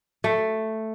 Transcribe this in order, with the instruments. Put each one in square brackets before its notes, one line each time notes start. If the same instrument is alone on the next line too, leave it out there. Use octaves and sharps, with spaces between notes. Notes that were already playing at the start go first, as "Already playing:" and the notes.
[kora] A3